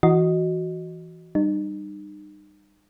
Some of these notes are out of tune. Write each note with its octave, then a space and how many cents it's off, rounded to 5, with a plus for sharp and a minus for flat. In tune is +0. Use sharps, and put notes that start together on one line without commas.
E3 +0 F#4 +0 D#5 +0
G3 +0 D#4 -35